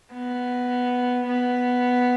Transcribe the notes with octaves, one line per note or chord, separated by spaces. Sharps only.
B3
B3